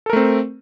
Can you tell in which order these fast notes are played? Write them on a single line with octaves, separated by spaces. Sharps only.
A4 A#4 A3 C4